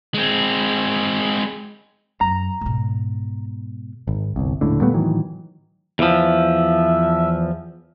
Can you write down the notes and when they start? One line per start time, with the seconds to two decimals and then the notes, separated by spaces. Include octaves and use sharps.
0.14 G#3 C4
2.21 F#2 A#5
2.61 G#2 B2
4.07 G#1
4.36 G1 C2
4.61 D#1 C#2 A2 D3
4.81 A#2 G3 A3 B3
4.94 A2 D#3 E3 F#3
5.99 E2 F3 E5